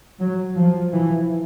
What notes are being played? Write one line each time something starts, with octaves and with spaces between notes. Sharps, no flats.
F#3
F3
E3